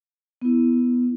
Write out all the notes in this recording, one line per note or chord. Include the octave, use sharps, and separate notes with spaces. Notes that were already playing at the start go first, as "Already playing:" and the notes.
B3 E4